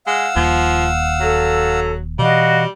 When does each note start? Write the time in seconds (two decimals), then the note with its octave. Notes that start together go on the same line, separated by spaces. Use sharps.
0.07 G#3 F5 F#5 E6
0.36 D#1 D#2 F3
1.21 F#3 A4
2.19 B2 E3 G3 F#4 D#5 F5